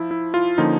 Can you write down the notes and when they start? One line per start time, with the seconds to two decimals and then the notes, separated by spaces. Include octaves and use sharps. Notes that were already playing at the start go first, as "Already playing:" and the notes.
Already playing: F3 E4
0.11 E4
0.34 F4
0.58 D3 F3 A#3 C#4 D#4